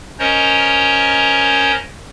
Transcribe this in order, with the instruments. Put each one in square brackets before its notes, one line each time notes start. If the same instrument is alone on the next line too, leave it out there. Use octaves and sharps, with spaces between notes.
[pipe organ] C#4 A#4 C5 C#5 D#5 A#5